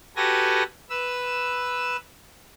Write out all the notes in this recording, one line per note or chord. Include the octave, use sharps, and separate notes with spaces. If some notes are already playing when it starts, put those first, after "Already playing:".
F#4 G4 A4 B4 G#5 A#6
B4 E6